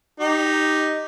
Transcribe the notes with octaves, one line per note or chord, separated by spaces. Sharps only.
D#4 G4